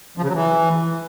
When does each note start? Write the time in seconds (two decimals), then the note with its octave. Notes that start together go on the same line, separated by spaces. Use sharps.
0.18 F3
0.23 C#3
0.29 F#3
0.35 E3